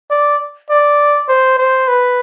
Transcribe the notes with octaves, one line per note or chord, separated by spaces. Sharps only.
D5
D5
C5
C5
B4